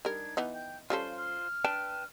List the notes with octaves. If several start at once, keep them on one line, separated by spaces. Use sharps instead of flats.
G3 D4 D#4 A#4 G#6
E3 B3 D#4
G5 G6
G3 C#4 F4 A4 C5 F5
F6
D4 B4 G5 A5